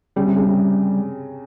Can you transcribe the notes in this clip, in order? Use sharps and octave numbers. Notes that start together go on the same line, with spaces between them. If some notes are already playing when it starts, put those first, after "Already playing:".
C#3 G3
C3
C#3
C3